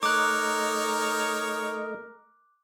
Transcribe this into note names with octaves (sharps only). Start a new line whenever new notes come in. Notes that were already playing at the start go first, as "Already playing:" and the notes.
A3 D#4 A#4 C#5 D#5 D6 F#6